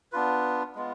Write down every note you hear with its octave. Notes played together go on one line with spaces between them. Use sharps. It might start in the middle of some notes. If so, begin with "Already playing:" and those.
B3 D4 F4 B4
G#3 B3 F4